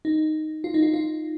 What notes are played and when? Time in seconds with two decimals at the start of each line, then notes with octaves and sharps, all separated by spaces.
0.05 D#4
0.64 F4
0.74 D#4
0.82 F4
0.94 F4